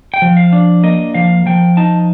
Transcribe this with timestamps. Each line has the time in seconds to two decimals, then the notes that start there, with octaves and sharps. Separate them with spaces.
0.14 G5
0.22 F3
0.37 F5
0.53 D4
0.83 A#3 D#5
1.14 F3 F5
1.46 F3 G5
1.77 D#4 A5